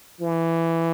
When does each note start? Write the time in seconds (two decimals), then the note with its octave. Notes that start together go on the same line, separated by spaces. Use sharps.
0.21 E3